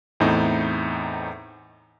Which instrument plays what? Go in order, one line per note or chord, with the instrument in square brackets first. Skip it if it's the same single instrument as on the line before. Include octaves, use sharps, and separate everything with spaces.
[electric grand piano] E2 A2 C4 D#4 E4